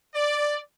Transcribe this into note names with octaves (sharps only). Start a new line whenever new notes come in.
D5